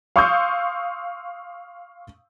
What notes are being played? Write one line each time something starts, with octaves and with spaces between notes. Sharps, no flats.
F5 C6 C#6 D#6 E6 G6